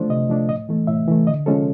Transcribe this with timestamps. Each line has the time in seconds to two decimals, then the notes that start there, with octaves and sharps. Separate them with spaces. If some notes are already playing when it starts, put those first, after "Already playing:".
Already playing: F3 A3 D4 C5
0.10 C3 D#5
0.29 F3 A3 D4
0.49 A2 D#5
0.69 E3 A3
0.87 A2 E5
1.08 E3 A3
1.27 D3 D#5
1.46 F3 G#3 C#4 A4